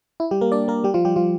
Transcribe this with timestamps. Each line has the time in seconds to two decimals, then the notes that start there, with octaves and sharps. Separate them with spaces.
0.20 E4
0.31 G3 G4
0.41 A#3 A#4
0.52 D4 D5
0.68 A#3 A#4
0.84 G3 G4
0.94 F3 F4
1.05 G3 G4
1.16 F3 F4